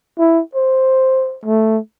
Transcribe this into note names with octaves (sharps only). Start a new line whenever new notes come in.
E4
C5
A3